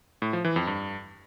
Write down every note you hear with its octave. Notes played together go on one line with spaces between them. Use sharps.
A2
F3
E3
F2
G2